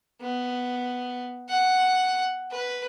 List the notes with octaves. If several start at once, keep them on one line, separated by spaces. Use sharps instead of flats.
B3
F#5
B4